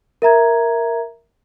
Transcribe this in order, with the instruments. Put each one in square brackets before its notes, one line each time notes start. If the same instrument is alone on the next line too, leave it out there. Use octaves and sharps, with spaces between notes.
[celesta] A#4 E5 A#5 G#6